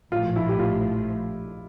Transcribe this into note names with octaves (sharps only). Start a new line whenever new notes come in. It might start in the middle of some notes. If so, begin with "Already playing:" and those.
A#1 A2 F3 F4
E4
G4
F4